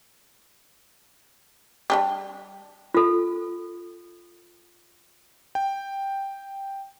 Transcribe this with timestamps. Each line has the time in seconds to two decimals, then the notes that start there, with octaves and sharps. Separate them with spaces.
1.90 G3 D4 G4
2.94 F4 A4
5.55 G5